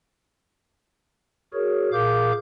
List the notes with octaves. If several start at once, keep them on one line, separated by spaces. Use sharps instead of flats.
F#4 G#4 A#4 C#5
A#2 G#4 A#4 F5 D6 G6